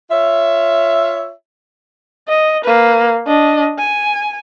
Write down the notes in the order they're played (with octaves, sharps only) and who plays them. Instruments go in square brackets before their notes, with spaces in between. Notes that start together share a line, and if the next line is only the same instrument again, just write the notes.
[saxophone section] F4 C#5 E5
[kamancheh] D#5
A#3 B4
D4 D#5
G#5